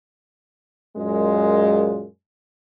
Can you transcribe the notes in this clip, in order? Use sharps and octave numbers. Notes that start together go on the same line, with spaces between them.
F#2 A#2 G#3